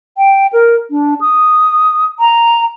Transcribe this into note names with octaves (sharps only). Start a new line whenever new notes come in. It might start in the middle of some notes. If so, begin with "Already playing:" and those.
G5
A#4
D4
D#6
A#5